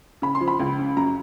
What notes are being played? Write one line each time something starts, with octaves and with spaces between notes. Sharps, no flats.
C#3 B5
C6
F3
B5
C#2
C#3
F#2 A#5